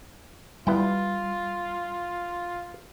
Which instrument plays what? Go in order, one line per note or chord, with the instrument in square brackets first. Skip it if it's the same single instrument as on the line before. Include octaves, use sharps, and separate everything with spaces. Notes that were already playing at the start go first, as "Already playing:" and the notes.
[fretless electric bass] G3 [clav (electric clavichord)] B3 E4 G5 [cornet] F4